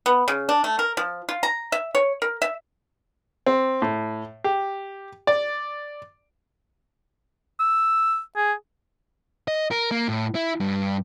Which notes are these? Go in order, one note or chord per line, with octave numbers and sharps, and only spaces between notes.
B3
C#3
D4
A3
A#4
F3
F4
A#5
E5
C#5
A#4
E5
C4
A2
G4
D5
E6
G#4
D#5
A#4
A#3
A2
E4
G2